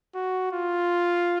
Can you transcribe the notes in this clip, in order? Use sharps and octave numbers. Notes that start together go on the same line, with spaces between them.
F#4
F4